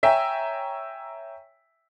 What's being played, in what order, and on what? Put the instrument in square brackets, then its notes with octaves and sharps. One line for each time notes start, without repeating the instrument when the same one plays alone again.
[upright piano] C#5 E5 G5 G#5 A#5